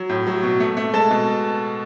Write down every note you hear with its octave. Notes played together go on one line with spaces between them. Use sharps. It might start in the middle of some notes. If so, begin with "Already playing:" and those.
Already playing: F#3
A2
F#3
B2
A3
A3
G#3 A4 A5
B2